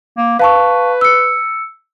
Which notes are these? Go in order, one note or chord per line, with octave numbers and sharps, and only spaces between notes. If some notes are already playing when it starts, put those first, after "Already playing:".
A#3
B4 F5 A5 C#6
E6 C#7